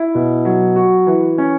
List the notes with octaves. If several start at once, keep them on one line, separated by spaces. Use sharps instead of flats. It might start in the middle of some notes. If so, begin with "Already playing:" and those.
Already playing: E4
B2
F#3
F#4
E3
C#4